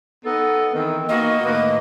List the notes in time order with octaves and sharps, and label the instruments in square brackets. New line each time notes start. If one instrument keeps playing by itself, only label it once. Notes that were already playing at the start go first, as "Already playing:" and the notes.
[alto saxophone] B3 [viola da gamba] D#4 [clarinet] A4
[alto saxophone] D#3 [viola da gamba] E3 [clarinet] C4
[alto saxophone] A#3 [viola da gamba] B3 D#4 F#4 [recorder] D#5
[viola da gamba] A2 D#3 [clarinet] A#3 [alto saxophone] B4